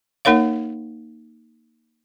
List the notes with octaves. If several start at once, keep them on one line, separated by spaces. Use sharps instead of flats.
A#3 D#4 A#4 C#5 F5